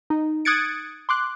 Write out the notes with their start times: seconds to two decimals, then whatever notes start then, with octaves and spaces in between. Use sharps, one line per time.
0.10 D#4
0.45 D#6 F#6 G#6 A6 C#7 D7
1.09 C6 D6 F#6